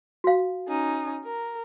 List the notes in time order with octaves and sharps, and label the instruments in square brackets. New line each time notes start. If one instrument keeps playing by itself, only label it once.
[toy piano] F#4 F5
[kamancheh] C#4 D#4
A#4